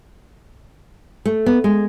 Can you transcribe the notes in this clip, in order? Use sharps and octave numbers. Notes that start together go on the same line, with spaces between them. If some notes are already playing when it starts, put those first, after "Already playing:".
A3
B3
G#3